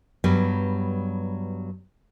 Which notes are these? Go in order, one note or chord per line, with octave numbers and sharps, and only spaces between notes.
G2 F#3 G3 B3